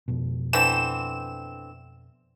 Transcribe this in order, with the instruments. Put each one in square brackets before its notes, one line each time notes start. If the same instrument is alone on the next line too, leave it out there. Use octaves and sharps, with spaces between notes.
[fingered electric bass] F2 B2
[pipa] D3 E3 C4 [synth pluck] E7